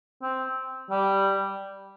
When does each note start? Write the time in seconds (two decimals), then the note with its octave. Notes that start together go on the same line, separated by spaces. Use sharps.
0.22 C4
0.90 G3